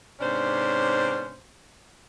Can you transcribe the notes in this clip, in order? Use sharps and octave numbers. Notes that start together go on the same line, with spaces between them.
G#2 C3 B3 C#4 D4 C5